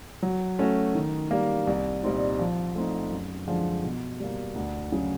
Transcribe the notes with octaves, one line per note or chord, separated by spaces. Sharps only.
F#3
A3 C#4 F#4
D#3
G3 A#3
C2
A#2 G3 C4 D#4
F3
A3 C4 D#4
F#2
D3 F3 G#3
B2
G3 A#3
D2
C#3 F#3